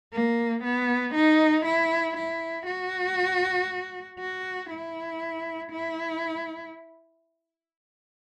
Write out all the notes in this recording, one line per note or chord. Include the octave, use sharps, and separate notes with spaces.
A#3
B3
D#4
E4
E4
F#4
F#4
E4
E4